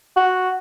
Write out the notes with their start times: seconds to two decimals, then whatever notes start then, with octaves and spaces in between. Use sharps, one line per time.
0.16 F#4